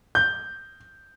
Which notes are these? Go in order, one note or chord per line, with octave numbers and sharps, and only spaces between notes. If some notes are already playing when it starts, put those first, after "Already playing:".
G6